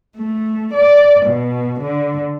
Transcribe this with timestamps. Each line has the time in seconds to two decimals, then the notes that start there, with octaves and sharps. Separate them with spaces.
0.16 A3
0.74 D5
1.26 B2
1.79 D3